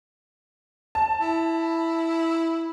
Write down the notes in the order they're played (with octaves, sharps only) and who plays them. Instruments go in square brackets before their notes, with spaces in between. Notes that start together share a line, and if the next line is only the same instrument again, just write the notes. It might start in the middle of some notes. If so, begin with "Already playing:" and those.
[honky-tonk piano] A5
[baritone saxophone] E4